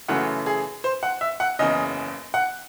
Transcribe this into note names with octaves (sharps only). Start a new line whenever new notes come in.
F#2 C#3 E3 A3 F#5
G#4
C5
F#5
E5
F#5
F#1 E2 C#3 D#5
F#5